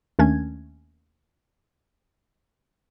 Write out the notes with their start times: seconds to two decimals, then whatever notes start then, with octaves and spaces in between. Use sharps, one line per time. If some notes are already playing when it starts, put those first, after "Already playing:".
0.19 D#2 D#3 A3 C#4 D4 G#6